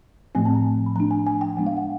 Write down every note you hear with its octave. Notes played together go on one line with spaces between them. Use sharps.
A2 F3 A3 C4 G#5
A5
A#5
B5
F3 A3 D4 A#5
G#5
G#5
G5
F3 G#3 B3 D4 F#5
F5
F#5